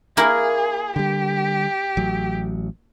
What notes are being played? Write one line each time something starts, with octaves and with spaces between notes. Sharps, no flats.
A#3 E4 G#4 A#4
D3 G3 G4
A1 F#3